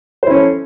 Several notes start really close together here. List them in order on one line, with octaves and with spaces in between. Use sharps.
C5 E4 C#4 A4